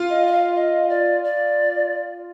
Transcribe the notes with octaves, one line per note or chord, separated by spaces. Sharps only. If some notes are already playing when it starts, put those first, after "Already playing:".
Already playing: F4
D#5
D#5
F5
D#5
D5
D5